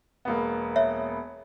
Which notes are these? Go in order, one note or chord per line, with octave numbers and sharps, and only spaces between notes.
E1 A#3 B3
C#5 E5